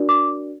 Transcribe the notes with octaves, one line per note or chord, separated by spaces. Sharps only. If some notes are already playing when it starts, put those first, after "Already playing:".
Already playing: D4 F#4 A#4 D5
D6